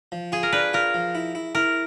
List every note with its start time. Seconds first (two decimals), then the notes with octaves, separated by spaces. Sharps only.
0.12 F3
0.32 F4 G#4
0.43 A#4
0.53 D4 B4
0.73 F4 A#4
0.94 F3
1.15 E4
1.35 E4
1.55 E4 A#4